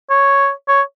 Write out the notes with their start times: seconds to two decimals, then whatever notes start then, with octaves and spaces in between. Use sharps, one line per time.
0.10 C#5
0.68 C#5